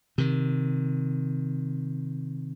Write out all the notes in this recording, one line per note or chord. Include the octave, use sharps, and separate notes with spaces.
C3 D#3